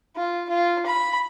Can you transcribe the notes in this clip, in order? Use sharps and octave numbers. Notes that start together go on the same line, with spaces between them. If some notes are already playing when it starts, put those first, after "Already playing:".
F4
F4
B5